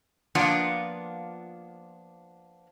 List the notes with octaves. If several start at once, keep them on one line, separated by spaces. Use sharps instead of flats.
F3 A#3 B3 D4 F4 F#5